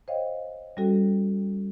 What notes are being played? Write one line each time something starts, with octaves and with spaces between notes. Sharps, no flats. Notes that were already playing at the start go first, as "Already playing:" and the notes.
C5 C#5 D#5 F5 G5
G3 C#4 F#4 A4 G5